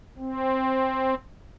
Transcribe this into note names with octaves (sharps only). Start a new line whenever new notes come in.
C4